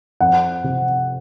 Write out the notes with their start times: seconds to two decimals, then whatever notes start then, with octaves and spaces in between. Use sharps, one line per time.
0.21 F2 F#5
0.64 C3